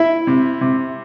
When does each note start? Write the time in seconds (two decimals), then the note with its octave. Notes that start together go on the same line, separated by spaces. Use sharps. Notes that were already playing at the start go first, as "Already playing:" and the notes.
Already playing: E4 E5
0.27 C3
0.61 C3